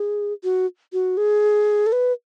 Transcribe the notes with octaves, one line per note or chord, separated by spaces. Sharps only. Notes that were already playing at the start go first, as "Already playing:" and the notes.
Already playing: G#4
F#4
F#4
G#4
A4
B4